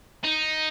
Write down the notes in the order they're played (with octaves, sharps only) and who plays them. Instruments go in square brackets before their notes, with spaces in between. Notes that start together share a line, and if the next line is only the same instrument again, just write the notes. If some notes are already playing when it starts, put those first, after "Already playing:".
[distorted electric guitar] D#4